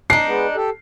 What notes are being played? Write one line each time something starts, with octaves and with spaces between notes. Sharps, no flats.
D4 D#4 C7
G#3 B3
G4 A4